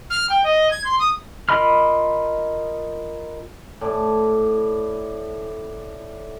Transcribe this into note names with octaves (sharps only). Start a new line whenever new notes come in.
F6
G5
D#5
G#6
C6
D#6
F4 A#4 D#5 B5 F6
A2 D5